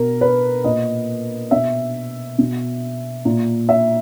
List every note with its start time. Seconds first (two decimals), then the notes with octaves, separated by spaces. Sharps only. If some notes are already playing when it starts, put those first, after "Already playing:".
Already playing: B2 A#4
0.21 B4
0.64 A#2 D#5
1.51 B2 E5
2.39 B2
3.25 A#2
3.69 E5